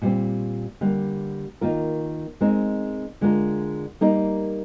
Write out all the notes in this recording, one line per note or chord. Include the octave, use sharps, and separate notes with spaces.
A#2 G3 C4
D3 G3 A#3
D#3 A#3 F4 A#4
G#3 C4 D#4 A#4
D3 G#3 D4 F4 A#4
G3 A#3 D#4 A#4